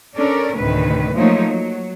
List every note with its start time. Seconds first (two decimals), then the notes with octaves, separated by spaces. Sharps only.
0.16 C#4 D4 A4 A#4 D5
0.56 D2 A2 C3 D#3 B4
1.15 F3 F#3 A3 A#3 D#4 C#5
1.48 F#3